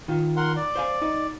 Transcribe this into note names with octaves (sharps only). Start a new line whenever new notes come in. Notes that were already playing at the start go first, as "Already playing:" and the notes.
D#3 F4
A#4 F#5 C6
D5
C5 F5 G#5
D#4